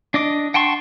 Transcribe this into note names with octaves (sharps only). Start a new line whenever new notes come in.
D4 D#5 D6
F#5 G5 A5 C6 C#6